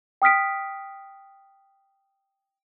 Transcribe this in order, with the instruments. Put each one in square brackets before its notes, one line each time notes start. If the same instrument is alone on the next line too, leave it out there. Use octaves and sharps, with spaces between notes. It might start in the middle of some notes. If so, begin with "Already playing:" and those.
[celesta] G5 D#6 F6 B6 D7